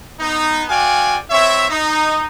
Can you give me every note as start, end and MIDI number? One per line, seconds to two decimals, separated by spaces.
0.20 0.64 59
0.20 0.64 63
0.69 1.16 66
0.69 1.16 74
0.69 1.16 77
0.69 1.16 79
0.69 1.16 80
1.31 1.66 60
1.31 1.66 64
1.31 1.66 73
1.31 1.66 76
1.70 2.26 63